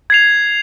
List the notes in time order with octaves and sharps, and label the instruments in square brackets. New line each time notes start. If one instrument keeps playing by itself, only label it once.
[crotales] G#6 C7 F7